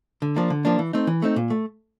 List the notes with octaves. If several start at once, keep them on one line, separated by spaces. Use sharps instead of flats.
D3
F3 A#3 D4
D3
F3 A#3 D4
E3
A3 C4 D#4
E3
A3 C4 D#4
A#2
A3